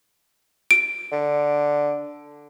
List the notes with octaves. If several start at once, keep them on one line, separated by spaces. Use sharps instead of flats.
D7
D3